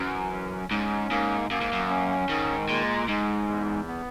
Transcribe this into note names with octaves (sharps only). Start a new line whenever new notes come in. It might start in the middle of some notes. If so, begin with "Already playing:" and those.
Already playing: F#2 E3
C#4
G#2 C#4
G#2 A#3
F#2 A#3
G#2
F#2
C#4
G#2 D#3
A#2 G#3
G#2 G#3
E2
B3